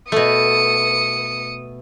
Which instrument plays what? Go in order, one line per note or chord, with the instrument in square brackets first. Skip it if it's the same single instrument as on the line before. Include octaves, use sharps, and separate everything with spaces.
[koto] B2 A3 [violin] D#6 C#7